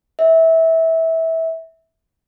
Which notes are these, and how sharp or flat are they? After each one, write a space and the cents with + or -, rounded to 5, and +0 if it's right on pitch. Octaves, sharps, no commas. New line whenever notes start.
E5 -20